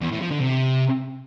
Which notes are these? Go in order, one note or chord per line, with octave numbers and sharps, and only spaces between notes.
E2
A2
F3
D3
C3